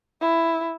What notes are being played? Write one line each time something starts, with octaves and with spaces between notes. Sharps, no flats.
E4